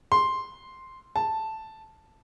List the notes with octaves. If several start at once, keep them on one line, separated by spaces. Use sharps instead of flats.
C6
A5